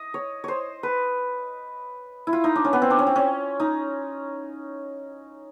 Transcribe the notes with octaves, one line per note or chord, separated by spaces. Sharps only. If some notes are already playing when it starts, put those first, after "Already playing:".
Already playing: D#5
C#5
C5 C#5
B4
E4
F4
D#4
D4
C#4
B3
C4
D4
C#4
C4
C#4
D#4